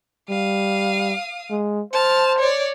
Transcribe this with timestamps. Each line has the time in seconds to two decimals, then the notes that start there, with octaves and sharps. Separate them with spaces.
0.30 G3 F5 D#6
1.50 G#3
1.93 C5 A5 F6
2.39 C#5 D5